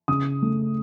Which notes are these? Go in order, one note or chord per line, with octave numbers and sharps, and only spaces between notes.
C#3 D#6
A3